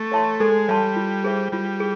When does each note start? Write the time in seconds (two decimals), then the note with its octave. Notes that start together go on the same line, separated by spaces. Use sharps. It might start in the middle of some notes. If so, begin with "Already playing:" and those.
Already playing: A3
0.12 C#5 E5 A5 C6
0.40 G#3 A4
0.68 G3 C#5 E5 A5 C6
0.96 F4
1.24 G#4 C5 E5
1.52 G3 F4
1.80 G#4